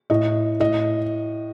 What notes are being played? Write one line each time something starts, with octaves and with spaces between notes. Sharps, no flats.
A2 D#5
A2 D#5